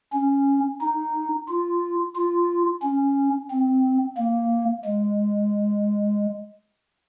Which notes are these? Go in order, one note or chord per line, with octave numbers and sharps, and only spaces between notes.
C#4
D#4
F4
F4
C#4
C4
A#3
G#3